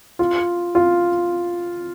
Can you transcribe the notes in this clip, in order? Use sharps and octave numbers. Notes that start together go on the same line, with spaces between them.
F4
F4